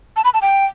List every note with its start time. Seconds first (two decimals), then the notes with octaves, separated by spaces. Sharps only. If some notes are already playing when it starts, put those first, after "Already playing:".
0.16 A5
0.25 B5
0.34 A5
0.42 G5